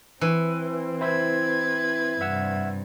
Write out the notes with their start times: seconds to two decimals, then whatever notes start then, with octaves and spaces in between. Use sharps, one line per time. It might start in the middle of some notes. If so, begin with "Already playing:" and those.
0.21 E3 C4
1.01 E4 B4 C5 E5 G#6
2.21 G2 C3 E5 F#5 E6